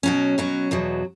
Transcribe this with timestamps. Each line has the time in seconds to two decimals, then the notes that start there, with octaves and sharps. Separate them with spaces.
0.03 B2 F#3 C#4
0.38 B2 F#3 C#4
0.71 E2 B2 F#3